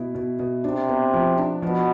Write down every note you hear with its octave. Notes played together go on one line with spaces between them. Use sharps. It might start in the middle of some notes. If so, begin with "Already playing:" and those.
Already playing: B2 E4
B2
B2
C3 D4
B3
F3
D4
B2 F3